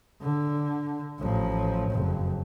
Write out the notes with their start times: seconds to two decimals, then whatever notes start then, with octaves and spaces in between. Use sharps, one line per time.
0.21 D3
1.19 A1 F3
1.91 F#1 F2